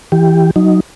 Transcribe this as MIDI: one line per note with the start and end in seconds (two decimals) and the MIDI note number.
0.12 0.51 52
0.12 0.51 67
0.56 0.80 54
0.56 0.80 63